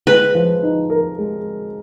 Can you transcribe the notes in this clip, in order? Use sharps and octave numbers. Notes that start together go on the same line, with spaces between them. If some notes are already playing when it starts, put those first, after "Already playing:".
G#3 B4
F3
D#4
A#4
G#3